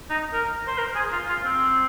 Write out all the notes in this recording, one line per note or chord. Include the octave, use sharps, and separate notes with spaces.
D#4
A#4
C5
A#4
G#4
F4
F4
C4